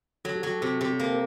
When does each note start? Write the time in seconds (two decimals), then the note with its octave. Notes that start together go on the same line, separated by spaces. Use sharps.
0.25 F#3 A4
0.36 G4
0.43 F#3 A4
0.61 C3 A4
0.81 C3
0.90 G4
1.00 A#3 A4
1.11 A#4